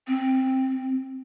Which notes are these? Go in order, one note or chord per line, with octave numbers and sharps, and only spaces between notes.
C4